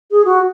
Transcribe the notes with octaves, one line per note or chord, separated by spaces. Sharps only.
G#4
F#4